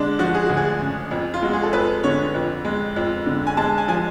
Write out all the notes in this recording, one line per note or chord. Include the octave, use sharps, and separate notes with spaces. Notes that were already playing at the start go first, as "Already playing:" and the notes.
Already playing: D3 G#3 D4
F3 F#4
G#4
D2 F#4
G#4
C#3
F2
F4
G#3 F#4
G#4
A4
F2 B4
D3 C#5
F2
G#3
F2
D3
G#5
G#3 A5
G#5
F3 G#5